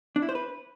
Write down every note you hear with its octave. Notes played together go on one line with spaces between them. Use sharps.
D4
E4
C5
B4